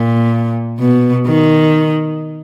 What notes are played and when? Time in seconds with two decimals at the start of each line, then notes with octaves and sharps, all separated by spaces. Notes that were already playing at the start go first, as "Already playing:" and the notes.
Already playing: A#2
0.80 B2
1.26 D#3